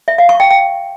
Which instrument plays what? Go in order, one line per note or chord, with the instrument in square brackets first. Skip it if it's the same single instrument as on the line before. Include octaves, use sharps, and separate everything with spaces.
[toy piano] E5
F5
C#6
G5
G5